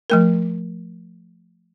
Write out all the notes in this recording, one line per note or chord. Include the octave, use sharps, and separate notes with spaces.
F3 A3 A#4